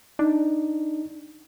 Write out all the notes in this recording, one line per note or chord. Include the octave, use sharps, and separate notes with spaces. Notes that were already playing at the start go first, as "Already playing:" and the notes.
D4 D#4